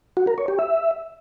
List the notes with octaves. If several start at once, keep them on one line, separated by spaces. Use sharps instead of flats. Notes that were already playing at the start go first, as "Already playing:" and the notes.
F#4
A#4
C#5
G4
E5